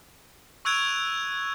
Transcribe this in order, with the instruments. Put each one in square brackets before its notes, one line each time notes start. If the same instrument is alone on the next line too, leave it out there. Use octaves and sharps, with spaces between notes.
[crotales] C#6 E6 F#6 G#6 D7 F7